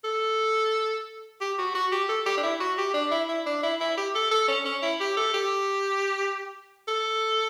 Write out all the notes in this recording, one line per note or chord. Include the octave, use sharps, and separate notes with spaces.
A4
G4
F#4
F#4
G4
A4
G4
D4
E4
F#4
G4
D4
E4
E4
D4
E4
E4
G4
A4
A4
C#4
C#4
E4
G4
A4
G4
A4